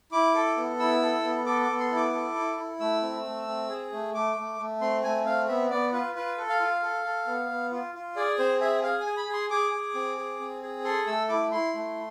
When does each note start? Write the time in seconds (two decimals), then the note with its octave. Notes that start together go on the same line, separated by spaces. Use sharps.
0.12 E4 D6
0.35 A4
0.57 B3
0.79 E4 E6
1.02 A4
1.24 B3
1.46 A4 D6
1.63 D6
1.69 B3
1.80 C6
1.91 E4
1.96 D6
2.13 A4
2.36 E4
2.57 E4
2.80 A3 E6
3.02 C4
3.25 A3
3.47 C4
3.69 G#4
3.92 A3
4.14 A3 D6
4.36 A3
4.59 A3
4.81 C4 C6
5.03 A3 G#5
5.26 C4 F5
5.48 B3 E5
5.70 B3 D5
5.93 F4 B4
6.15 F4 B4
6.38 A4
6.49 F5
6.60 F4
6.83 A4
7.05 A4
7.27 B3
7.49 B3
7.71 F4
7.94 F4
8.16 G#4 D5
8.38 C4 C5
8.61 G#4 E5
8.83 G#4 F5
9.00 G#5
9.06 G#4
9.17 B5
9.28 G#4
9.33 C6
9.50 G#4 D6
9.73 G#4
9.95 C4
10.17 G#4
10.40 C4
10.62 G#4
10.84 A4 C6
11.07 A3 E6
11.29 E4 D6
11.52 E4 C6
11.74 A3